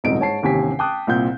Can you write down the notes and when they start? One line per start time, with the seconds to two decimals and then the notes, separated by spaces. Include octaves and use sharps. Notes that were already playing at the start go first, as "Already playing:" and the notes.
0.04 D#1 C2 G#2 D#4 D7
0.19 G#2 C#5 A5 C7
0.42 A1 D#2 C3 G#5 B6
0.79 G5 A5 D6 D#6 F#6
1.07 C2 A#2 C4 G6